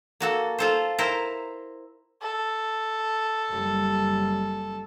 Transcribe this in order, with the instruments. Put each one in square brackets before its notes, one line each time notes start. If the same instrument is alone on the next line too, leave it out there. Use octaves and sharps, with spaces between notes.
[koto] A#3 F#4 A4
F4 A4 C5
E4 A#4 C5
[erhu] A4
[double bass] F#1 G3